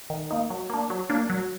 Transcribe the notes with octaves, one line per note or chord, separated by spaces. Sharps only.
D#3
A#3 D#4
F#3
A#3 D4
F#3
A#3 D4
F#3